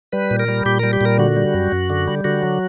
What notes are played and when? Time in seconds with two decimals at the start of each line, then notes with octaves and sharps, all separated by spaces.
0.12 G3 B4
0.31 A#2
0.39 A#4
0.48 G3
0.65 A#2 G4
0.79 G3 A#4
0.93 G4
1.01 A#2 A#4
1.19 D3 F#4
1.36 G3
1.54 F#2
1.72 F#2
1.90 D3
2.08 G3
2.24 D3 F#4
2.42 F#3